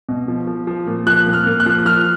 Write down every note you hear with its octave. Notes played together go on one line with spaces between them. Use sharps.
B2
F3
F3
F3
A#2
F3 F#6
A#2
F6
A#2
F#6
F3
F3 F6